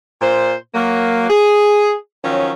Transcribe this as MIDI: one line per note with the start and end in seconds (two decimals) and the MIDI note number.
0.22 0.54 46
0.22 0.54 72
0.75 1.25 54
0.75 1.25 58
1.30 1.94 68
2.24 2.52 51
2.24 2.52 53
2.24 2.52 54
2.24 2.52 61